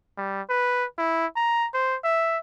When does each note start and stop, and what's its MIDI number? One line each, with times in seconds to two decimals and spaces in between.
0.17 0.42 55
0.49 0.85 71
0.98 1.26 64
1.36 1.68 82
1.74 1.96 72
2.04 2.38 76